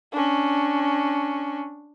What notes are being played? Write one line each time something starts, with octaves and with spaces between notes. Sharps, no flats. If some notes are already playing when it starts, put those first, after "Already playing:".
C#4 D4